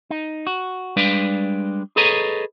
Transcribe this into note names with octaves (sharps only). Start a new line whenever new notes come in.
D#4
F#4
G3 G#3 D4 B4 D5 F5
G#4 A4 B4 C#5 D#5 A#5